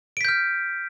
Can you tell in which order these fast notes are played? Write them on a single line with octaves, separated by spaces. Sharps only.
D7 B6 G6 F6